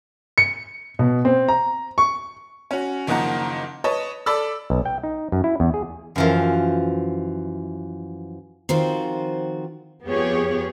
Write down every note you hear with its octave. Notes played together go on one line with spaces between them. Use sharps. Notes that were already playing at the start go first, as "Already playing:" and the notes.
C#7
B2
C4
A#5
C#6
C#4 F#4
F#1 D#3 F3 A#3 F#5 A#5
B4 C#5 D#5 A5
A4 D5 B5 E6
B1
G5
D#4
F#2
E4
E2
G#4
F#2 E3 F3
D#3 F3 C4 F4 F#4
F2 B3 F4 G4 G#4 C#5